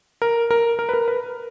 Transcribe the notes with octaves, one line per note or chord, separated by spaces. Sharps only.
A#4
A#4
A#4
B4
A#4
B4